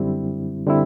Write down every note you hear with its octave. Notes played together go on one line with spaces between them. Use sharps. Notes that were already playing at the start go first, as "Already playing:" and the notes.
Already playing: F#2 D3 G3 C4 E4
D3 G3 C4 E4